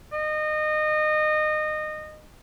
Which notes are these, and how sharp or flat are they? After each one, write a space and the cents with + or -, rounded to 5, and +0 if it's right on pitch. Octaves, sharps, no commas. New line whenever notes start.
D#5 -25